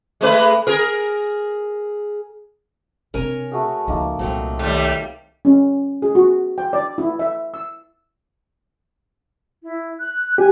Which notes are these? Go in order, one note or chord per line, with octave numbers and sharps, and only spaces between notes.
G#3 A3 B4
G#4 A#4
C3 D4 A#4 C#5 G#5
A3 F#4 G#4
C#2 F3 A#3 D#4 A4
C2 A#2 F#3 A3 C4 F#5 A#5
D#2 G3 A3
C#4
G#4
F#4
G5
D5
E4
E5
E6
E4
F#6
G4 G#5